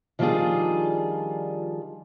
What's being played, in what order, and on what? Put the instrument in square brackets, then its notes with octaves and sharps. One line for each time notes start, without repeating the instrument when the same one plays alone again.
[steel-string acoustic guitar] D#3 F3 G3 D4 F4 G#4